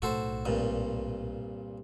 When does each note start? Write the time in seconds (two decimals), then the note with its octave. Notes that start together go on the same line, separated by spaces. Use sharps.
0.02 B1 A2 F#4 A4 C5
0.45 C2 G2 A#2